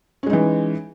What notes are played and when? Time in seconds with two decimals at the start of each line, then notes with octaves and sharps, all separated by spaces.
0.23 C#4
0.26 G#3
0.30 D#4
0.33 E3